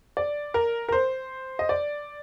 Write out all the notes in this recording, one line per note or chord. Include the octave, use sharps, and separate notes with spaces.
D5
A#4
A#4
C5
D#5
D5